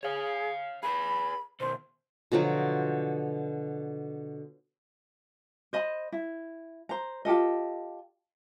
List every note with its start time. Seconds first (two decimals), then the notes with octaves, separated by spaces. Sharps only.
0.03 G#4 C#5 F5
0.83 G#4 B4 B5
1.60 B2 D#3 C5
2.32 B2 D3 F3 F#3
5.73 C5 D#5 B5
6.12 E4
6.89 C5 A#5
7.25 F4 G4 A4 D#5